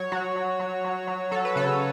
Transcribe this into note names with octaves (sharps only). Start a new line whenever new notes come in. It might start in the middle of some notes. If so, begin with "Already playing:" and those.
Already playing: F#3 C#5
F#3 F#4
F#3
F#3
F#3
F#3
F#3 A4
B4
C#3 A4